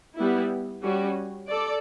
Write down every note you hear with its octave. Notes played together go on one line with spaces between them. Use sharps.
G3 B3 E4
G3 C#4 F#4
A4 D5